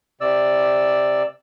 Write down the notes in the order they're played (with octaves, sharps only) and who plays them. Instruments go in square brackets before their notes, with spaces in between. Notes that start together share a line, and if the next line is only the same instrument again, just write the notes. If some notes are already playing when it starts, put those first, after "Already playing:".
[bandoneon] C3 D5 E6